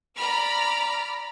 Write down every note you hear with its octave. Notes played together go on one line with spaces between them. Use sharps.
D5 A#5 B5 F6